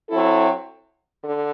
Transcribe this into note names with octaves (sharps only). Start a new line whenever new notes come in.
F#3 C4 E4 A4
D3